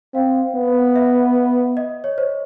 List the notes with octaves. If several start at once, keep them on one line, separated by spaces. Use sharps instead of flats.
C4 F5
B3
E5
D#5
C#5
C5